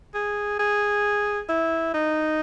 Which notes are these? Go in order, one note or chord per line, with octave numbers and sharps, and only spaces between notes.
G#4
G#4
E4
D#4